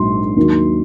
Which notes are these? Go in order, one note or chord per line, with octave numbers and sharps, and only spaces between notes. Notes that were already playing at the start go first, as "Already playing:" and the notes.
Already playing: A#1 G#2 F#3 C6
D#2 D#3 F#3